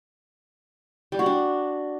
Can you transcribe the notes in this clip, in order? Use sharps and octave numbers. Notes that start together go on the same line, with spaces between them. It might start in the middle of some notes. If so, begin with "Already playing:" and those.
G3
F#4
D4